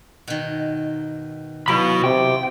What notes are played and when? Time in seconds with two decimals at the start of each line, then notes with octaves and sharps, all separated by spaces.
0.28 B2 D#3
1.68 C3 F#3 E4 F#4 F5 B5
2.04 C3 G5 C6 D6